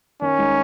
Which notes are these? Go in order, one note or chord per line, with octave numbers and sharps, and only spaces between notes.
D#3 C#4
G#3 D#4